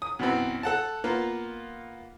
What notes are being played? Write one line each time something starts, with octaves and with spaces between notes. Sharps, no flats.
D#6
F#2 B2 E3 B3 C4
A4 F#5 A5
A#3 B3 F4